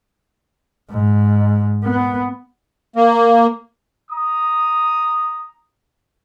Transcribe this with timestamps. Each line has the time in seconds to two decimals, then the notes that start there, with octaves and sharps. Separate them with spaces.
0.91 G#2
1.84 B3
2.96 A#3
4.11 A#5 D#6